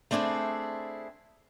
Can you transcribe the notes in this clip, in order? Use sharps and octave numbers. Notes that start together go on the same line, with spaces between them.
A3 C4 D4 E4 F#4 G#4